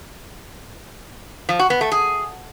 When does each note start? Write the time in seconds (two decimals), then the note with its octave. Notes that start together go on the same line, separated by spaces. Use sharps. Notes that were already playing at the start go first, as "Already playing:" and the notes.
1.49 F3
1.59 F#4
1.70 B3
1.81 A3
1.92 G#4